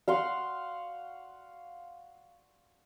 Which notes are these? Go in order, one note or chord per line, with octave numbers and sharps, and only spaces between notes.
F5 F#5 C6 C#6